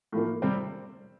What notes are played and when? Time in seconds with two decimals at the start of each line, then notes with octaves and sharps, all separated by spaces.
0.12 A2 F3 A#3
0.42 C3 G3 C4